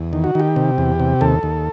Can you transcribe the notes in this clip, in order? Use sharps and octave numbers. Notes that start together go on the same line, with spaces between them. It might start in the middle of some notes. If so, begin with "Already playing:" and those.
Already playing: E2
D#3
F#4
D#3 G4
C3
E2
C3
D#2 A4
D#2